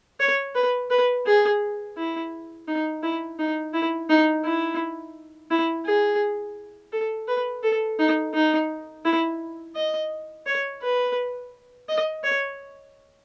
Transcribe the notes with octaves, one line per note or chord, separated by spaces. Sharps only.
C#5
B4
B4
G#4
E4
D#4
E4
D#4
E4
D#4
E4
E4
G#4
A4
B4
A4
D#4
D#4
E4
D#5
C#5
B4
D#5
C#5